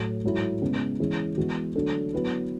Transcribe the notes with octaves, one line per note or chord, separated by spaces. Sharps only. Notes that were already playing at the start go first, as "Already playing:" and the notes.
Already playing: A2 F#3 A3
G#2 F#3 A3 E4
C#3 G#3 B3
E3 G#3 C#4 E4 G#4
E3 G#3 B3 F#4
D3 F#3 A3 D4 A4
F#3 B3 E4 B4